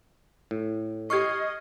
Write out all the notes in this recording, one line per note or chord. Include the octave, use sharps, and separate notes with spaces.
A2
G4 D#5 C#6 F6 G#6 C7